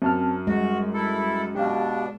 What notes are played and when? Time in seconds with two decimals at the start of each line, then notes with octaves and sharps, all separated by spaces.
0.02 F#2 C4 A5 F6
0.47 G3 G#3 F#4
0.94 E4 A4
1.55 B2 D4 G4 F5